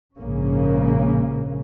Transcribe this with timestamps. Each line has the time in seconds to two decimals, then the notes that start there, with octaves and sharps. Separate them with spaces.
0.17 A#1 G#2 C#3 A#3 C#4